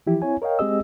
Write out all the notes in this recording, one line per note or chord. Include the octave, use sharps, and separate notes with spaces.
E3 F3 E4 G4
C4 E4 C#5 G#5
A#4 C#5 D#5 F5 G5
G#3 C4 G4 G#4 D#5 E6